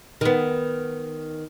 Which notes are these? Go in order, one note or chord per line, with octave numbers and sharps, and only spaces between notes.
D#3 B3